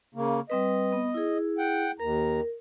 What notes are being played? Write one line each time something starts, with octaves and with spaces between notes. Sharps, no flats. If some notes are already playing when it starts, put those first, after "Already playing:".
C#3 A#3
G3 C4 B4 D#5
B3
E4 G#4
F#5 G5
D#2 A#4 A#5